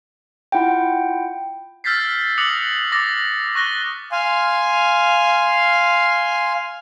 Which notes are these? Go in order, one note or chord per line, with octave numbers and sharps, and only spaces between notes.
E4 F4 F#5 G5
E6 F6 G6 A6 B6 C7
D6 D#6 F#6 A#6 C#7 F#7
D6 A6 A#6
C#6 F#6 A#6 G7
F5 G#5 C6